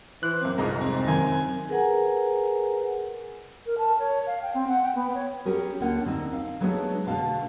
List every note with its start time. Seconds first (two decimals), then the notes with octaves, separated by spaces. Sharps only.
0.23 E3 C5 F#6
0.41 F#2 C4 D6
0.58 C2 F2 G#2 G#4 A#5
0.81 C4
1.08 F#2 D#3 G#5
1.69 G#4 A#4 B4 F#5 G#5 A#5
3.66 A#4
3.78 A5
3.99 C#5
4.27 F5
4.42 G5
4.54 C4
4.68 F#5
4.83 G5
4.95 B3
5.14 C#5
5.46 C#4 G4 G#4 A#4
5.80 D2 D3 A#3 C#4 F#5
6.06 D3 C4 D#4
6.33 F5
6.60 F#3 G#3 A3 B3 D4 G#4
7.07 B2 D3 A3 F5 A5